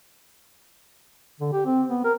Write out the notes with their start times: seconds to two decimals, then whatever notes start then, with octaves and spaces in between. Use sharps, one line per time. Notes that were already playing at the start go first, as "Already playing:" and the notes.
1.40 D3
1.52 G4
1.65 C4
1.89 B3
2.04 A#4